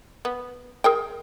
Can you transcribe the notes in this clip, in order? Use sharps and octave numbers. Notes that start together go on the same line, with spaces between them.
B3
G#4 A#4 G5